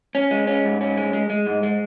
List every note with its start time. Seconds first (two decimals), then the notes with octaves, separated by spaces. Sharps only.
0.15 C#4
0.31 G#3
0.47 C#4
0.65 G#2
0.81 C#4
0.97 G#3
1.13 G#3
1.30 G#3
1.46 G#2
1.63 G#3